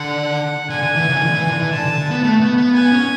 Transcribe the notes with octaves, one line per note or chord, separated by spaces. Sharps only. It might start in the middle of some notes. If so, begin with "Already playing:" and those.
Already playing: D3 F#5
D3 G#5
D3
E3
C#3
E3
D3
E3
D3
E3
D3 A5
D3
D3
B3
A3
B3
B3
B3 G#5
C#4